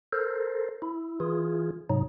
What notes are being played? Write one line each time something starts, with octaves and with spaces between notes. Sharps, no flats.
A4 A#4 C5
E4
E3 F4 G#4
G#2 C3 F#3 D#4